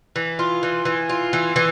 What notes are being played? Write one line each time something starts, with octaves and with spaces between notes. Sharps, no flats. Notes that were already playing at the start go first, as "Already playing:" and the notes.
E3
F4
E3
E3
F4
E3
E3